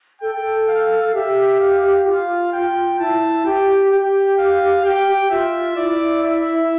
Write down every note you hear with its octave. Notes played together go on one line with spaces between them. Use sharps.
A4 G5
A4
F5
G4 E5
F5
F4 F5
G5
E4 A5
G4 G5
G4 G5
F5
G4 G5
G4
F4 E5
E4 D5
E5